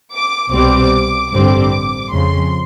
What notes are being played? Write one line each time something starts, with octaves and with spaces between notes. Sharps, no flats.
D6
C2 B2 G3 C4 D6
A1 G2 D3 G3 C4 D6
F2 C#3 F3 C6